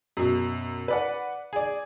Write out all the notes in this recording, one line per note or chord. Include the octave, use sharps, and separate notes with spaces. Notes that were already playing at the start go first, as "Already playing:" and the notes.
F#2 B2
B4 D5 F#5
G#4 D5